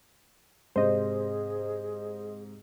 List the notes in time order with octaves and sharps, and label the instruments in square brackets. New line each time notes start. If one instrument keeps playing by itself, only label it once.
[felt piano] G#2 C3 [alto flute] G#4 [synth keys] C5 D#5